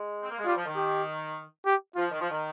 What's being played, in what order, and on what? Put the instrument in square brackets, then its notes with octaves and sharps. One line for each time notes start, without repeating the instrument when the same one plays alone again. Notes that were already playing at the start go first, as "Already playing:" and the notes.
Already playing: [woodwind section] G#3
C4
A#3
G#3
[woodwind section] G3 [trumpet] F4
[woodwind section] F3
D#3
[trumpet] G4
G4
[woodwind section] F3 [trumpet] F4
[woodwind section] D#3
F3
D#3